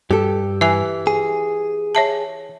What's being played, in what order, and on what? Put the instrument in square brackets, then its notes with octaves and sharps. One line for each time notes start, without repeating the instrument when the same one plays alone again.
[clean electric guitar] G2 [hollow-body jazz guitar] G4 A4
[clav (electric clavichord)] E3 [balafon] E5 G#5
[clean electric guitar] G#4
[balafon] C#5 E5 A5